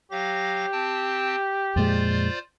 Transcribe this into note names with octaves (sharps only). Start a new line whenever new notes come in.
F#3 G4 F5 A#6
C4 G5 A5
F2 A#2 G#3 F4 C5 D5